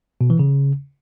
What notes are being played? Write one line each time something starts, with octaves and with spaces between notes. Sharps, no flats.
B2
E3
C#3